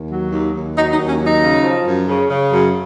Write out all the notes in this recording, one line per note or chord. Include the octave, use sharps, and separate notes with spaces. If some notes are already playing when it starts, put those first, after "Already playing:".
Already playing: D#2
F#3
D#2
D#2
F#3 D#4
D#4
D#2
C#4
F#3
D#4
C#3
F3
F#2
C#3
C#3
F#2